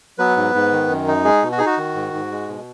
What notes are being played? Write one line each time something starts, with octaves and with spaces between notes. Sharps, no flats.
F#3 B3 B4
G#2
G#2
D#3
F#2
D#4
G#3 G#4
B2
F#4
D#4 G#4
F#4
D#3
G#2
G#2
G#3
B2